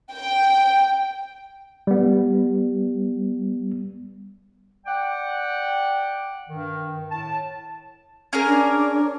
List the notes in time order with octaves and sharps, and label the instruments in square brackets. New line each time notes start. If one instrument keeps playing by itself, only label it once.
[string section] G5
[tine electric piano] G3 B3
[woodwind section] D5 F#5 G5
G2 D#3
A2 A5
[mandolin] C#4 G#4 A#4
[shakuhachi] D4